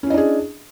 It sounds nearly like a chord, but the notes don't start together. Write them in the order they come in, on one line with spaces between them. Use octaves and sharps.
C#4 E4 D#5 D4 G#4